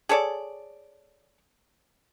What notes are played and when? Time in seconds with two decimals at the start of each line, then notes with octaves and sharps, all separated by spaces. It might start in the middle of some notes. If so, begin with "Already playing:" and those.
0.09 G#4 A4 C#5 D5